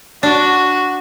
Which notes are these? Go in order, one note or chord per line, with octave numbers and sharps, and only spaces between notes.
D4 F#4